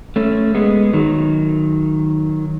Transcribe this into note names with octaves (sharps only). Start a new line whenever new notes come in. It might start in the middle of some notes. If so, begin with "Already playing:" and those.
A3 C#4
G#3 B3
D#3 F#3